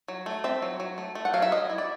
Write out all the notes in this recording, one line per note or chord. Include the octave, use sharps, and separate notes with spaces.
F#3
A3
C4 E5
F#3
F#3
A3
A3
F#5
F#3 F5
E5
F#3 D#5
E4
D5